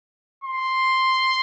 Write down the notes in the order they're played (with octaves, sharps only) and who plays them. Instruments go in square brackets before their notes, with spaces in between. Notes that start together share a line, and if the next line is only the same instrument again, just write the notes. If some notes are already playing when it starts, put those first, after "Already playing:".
[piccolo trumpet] C6